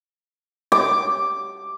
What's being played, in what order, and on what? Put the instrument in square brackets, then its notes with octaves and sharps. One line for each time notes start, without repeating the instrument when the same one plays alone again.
[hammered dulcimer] D6